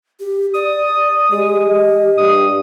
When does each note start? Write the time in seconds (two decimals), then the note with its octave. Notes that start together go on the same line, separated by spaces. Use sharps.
0.20 G4
0.54 D5 D#6
1.31 G#3 G4
1.69 D#5
2.18 G2 D#6